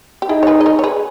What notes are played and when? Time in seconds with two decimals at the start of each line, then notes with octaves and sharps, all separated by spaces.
0.22 G4
0.29 D#4 E4 G#4
0.43 C#5
0.47 G#4 B4
0.61 D#5
0.66 A#4 C#5
0.79 C#5
0.84 G#4 B4